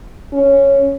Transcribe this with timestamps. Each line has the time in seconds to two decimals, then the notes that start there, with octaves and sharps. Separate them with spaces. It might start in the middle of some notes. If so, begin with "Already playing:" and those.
0.33 C#4